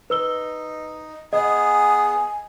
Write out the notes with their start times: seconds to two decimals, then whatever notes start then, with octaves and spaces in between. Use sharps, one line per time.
0.10 D#4 B4 E6 G7
1.33 B3 G#4 D#5 G#5